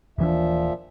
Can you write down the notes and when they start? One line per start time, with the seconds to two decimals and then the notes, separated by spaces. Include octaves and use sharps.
0.18 D#1 A#2 E3 F3 D4 E5